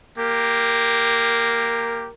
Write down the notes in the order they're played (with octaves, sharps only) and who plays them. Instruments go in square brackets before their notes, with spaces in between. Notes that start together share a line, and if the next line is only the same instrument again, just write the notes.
[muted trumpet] A#3 [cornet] G4 [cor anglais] A#4